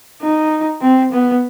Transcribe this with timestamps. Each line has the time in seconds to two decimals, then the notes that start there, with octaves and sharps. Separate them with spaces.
0.22 D#4
0.82 C4
1.13 B3